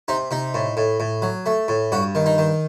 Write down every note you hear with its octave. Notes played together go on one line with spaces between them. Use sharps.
C3 D#4
C3 D#4
A2
A2
A2
F#3
A3
A2
G2 F#4
D#3
D#4
D#3